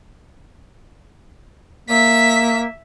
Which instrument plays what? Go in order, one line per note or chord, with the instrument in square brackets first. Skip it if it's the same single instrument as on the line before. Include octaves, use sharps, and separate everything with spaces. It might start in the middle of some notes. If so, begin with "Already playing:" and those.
[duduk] A#3 [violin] E5 B6